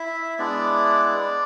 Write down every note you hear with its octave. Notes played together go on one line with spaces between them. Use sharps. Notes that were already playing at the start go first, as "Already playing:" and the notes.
Already playing: E4 E5
G#3 B3 D4 E4 D5